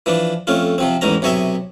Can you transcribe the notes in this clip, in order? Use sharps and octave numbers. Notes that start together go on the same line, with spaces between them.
E3 F3 D4
F2 A3 C#4 F4
C3 F3 C4
A1 E2 G#2 C#4 A#5
B1 C3 C#5 D#5 E5 G#5